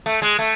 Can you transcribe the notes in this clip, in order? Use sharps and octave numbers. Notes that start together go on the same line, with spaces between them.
A3
G#3
A3